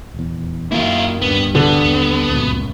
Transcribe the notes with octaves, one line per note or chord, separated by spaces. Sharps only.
D#1 E2
F#2 D#3 A#3 E4 F4
D1 G2 B3
D3 B3
D#2
D1 C#2 F#2 A#2